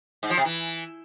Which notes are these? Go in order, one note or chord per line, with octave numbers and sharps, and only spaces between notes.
G#2
F3
C3
E3